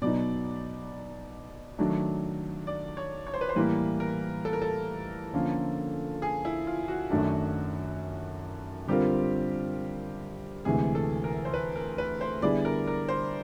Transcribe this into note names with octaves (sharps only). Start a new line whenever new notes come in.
B2 F#3 B3 D#4 D5
D#3 F#3 A3 D4
D5
C#5
C#5
C5
B4
C5
A2 E3 G3 A#3 B4
A#4
A4
A#4
A4
D3 F3 A#3 C#4 F4
G#4
E4
F4
F#4
F#2 D#3 F#3 A3 D4
D3 G3 C4 F4 G4 A#4
D2 C3 E3 G#3 G#4
A4
A#4
C5
B4
A#4
B4
C5
D3 G3 B3 E4 G#4 D5
A#4
A#4
C5